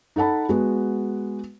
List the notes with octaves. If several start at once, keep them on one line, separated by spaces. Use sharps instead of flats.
D#4 A4 F#5 A5 B5
G#3 B3 F#4